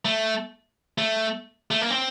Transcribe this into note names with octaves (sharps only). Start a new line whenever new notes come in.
A3
A3
A3
A#3
C4